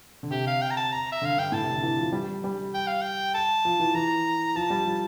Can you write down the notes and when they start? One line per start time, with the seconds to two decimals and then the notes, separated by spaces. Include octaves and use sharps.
0.23 D3
0.31 C3 G4
0.47 F5
0.62 G5
0.70 A#5
0.77 A5
0.92 A#5
1.12 E5
1.22 D3 F5
1.37 G2 G5
1.52 A2 A5
1.62 C3
1.73 D3
1.83 E3
1.98 F3
2.12 G3
2.44 G3
2.74 G5
2.87 F5
3.01 G5
3.34 A5
3.65 F3
3.80 E3
3.95 E3 A#5
4.56 F3 A5
4.70 G3
4.86 F3